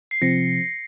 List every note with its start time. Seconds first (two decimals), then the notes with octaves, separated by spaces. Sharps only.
0.11 C7
0.22 C3 F3 C4 A#6 C#7